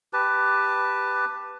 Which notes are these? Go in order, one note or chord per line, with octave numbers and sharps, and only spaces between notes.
G4 B4 A5